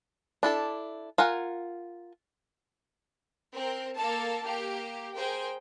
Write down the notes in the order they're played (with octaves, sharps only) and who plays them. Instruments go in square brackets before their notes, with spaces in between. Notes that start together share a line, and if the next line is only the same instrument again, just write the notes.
[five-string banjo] D4 E4 A4
F4 A#4 F#5 G#5
[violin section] C4 A#4
A#3 A4 A5
A#3 G4
G#4 A#4 C5 G5